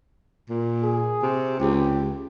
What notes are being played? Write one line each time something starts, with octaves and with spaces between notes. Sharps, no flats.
A#2
G#4
C3
C#2 G4